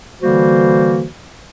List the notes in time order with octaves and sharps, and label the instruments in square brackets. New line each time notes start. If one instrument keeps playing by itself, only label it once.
[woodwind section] D3 E3 G3 A#3 F#4 C5